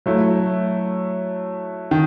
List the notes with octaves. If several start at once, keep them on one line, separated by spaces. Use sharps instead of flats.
F#3 A3 E4
D#3